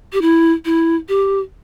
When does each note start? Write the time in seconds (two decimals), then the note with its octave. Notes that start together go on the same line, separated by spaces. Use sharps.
0.13 G4
0.22 E4
0.65 E4
1.09 G4